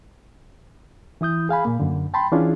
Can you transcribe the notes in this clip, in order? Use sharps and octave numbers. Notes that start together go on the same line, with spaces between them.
E3 E4 D#6 G6
G#4 F5 G#5 B5
A#2 A#3
F#2 D3
G5 A5 B5 C6
E3 C#4 D4 E4 F4 G#4